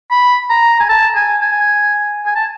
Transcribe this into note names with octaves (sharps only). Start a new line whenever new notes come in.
B5
A#5
G#5
A5
G#5
G#5
G#5
A5